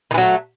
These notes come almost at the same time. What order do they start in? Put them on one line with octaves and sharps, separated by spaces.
D#3 E3 F#3 A3